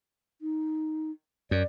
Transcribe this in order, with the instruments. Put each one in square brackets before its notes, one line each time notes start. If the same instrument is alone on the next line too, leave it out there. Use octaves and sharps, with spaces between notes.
[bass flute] D#4
[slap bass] F#2 [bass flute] D5